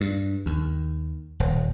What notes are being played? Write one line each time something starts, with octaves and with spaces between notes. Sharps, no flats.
G2
D#2
D#1